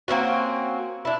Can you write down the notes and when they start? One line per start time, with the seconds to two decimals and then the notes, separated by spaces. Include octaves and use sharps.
0.08 A#3 C4 C#4 F#4
1.05 D4 E4